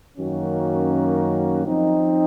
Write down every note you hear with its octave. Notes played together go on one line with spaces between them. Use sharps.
F#2 D#3 A#3 C#4 F#4
F3 C4 D#4